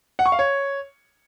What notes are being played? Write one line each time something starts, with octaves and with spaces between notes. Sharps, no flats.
F#5
C#6
F5
C#5